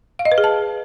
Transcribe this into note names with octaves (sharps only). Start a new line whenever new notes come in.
F5
D#5
B4
G#4
A5